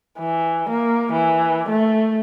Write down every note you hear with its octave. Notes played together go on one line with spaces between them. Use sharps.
E3
A#3
E3
A3